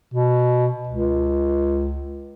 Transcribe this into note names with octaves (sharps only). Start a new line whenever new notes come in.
B2
C#2